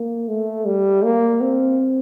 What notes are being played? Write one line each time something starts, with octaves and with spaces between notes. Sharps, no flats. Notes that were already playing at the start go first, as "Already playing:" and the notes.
Already playing: A#3
A3
G3
A#3
C4